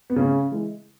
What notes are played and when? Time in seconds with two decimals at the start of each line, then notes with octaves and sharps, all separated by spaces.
0.10 B3
0.16 A2 C#3 C#4
0.52 E3 G#3